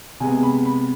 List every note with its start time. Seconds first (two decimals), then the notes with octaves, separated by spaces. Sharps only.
0.20 C3 G#3 B3 G#5
0.43 B5
0.65 B5